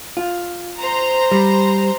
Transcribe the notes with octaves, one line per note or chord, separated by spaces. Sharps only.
F4
C5 A#5
G3